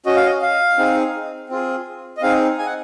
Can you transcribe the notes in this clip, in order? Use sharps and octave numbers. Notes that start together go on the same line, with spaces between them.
C#4 F#4 D#5
F5
D#5
F5
C4 D#4 G#4
C4 F4 G#4
D#5
C4 D#4 G#4 F5
G#5
F#5